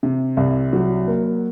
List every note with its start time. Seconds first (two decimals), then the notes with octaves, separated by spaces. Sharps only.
0.03 C3
0.37 C2
0.73 F#3
1.07 A#3